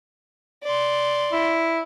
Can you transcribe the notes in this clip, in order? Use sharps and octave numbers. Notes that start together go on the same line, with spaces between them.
D5 C6
E4